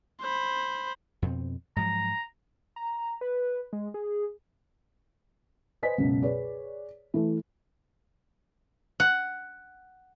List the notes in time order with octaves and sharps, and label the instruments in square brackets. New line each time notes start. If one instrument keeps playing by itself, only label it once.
[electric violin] C5 B5
[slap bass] F2 B2 C4
[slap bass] G#2 F3 F#3 [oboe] A#5
[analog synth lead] A#5
B4
G#3
G#4
[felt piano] B4 C5 D#5 G#5 B6
C#2 F#2 B2
G#4 B4 C#5 D5
E3 A3
[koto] F#5